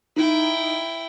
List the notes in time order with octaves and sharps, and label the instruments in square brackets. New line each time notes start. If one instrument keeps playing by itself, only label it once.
[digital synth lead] D#4 [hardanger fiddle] E4 G5